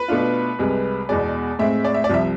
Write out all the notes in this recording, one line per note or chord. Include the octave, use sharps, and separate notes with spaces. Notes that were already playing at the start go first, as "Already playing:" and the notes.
Already playing: B4
B2 A3 D4 F4
C2 C3 G#3
E2 B2 G#3 D5
A2 G#3 C4 E5
D5
E5
D5
C2 C3 F3 E5